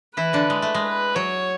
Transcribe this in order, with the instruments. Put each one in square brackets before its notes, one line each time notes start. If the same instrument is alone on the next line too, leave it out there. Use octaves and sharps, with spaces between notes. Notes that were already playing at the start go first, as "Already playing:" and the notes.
[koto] E3 E4 [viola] B4
[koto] D3 D4
G#3
A3
G#3
[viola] B4
[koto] F#3 [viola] C#5